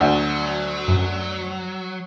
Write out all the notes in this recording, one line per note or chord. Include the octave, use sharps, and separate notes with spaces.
D2 F#3 F#5
F#2